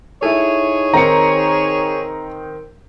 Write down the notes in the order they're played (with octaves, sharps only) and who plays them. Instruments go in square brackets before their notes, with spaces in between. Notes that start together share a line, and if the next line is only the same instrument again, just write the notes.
[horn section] D#4 G#4 C#5 [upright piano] E4 A4
[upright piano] D#3 C4 [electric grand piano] A#5 C#7